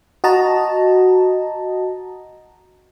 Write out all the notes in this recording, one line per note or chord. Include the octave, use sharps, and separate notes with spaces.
F#4 D#5 A5 A#5